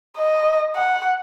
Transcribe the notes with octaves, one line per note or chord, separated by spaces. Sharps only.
D#5
F#5